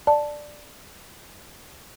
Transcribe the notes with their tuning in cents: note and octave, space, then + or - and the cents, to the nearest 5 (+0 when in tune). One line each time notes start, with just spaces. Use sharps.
D5 +10 A5 +0